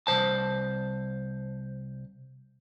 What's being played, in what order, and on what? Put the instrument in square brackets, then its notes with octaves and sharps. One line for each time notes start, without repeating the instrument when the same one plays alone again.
[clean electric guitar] C2 C3 C5 A5